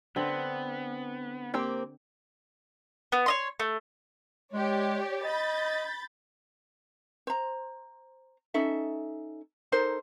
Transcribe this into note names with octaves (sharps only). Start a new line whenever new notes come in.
D3 B3 C4
A#3 C4 G4
B3
C#5 D#5 C6
A3
G#3 G4 C#5 D5
D#5 B5 G6 A6
C5 A#5
C#4 D#4 A4 E5
D#4 A4 A#4 C5